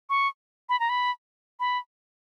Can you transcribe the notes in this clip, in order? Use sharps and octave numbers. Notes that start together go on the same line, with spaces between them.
C#6
B5
A#5
B5
B5